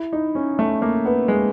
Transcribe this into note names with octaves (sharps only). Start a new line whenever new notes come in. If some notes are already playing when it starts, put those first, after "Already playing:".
Already playing: E4
D#4
C#4
A3
A#3
B3
G#3